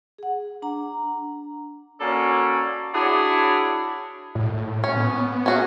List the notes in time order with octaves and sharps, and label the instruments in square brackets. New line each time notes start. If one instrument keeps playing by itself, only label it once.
[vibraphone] G#4 F#5
D4 A#5
[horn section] A#3 C#4 F#4 A4 D5
D4 E4 F#4 G#4 C#5 D5
[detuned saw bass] A2
[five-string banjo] C#4
[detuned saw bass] B3
[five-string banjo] C#4 F#4 G#4